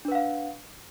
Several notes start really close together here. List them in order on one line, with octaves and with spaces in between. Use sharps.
D4 B4 F#5 F5